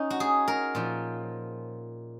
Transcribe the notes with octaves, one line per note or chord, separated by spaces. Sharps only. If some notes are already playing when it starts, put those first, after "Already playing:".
Already playing: C#4 D#4
F#4
G#4
A#4
A#2 F3